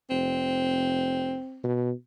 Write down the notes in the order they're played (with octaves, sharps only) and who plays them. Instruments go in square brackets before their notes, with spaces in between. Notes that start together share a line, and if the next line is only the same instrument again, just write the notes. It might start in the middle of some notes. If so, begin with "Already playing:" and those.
[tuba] F1 [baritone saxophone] C4
[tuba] B2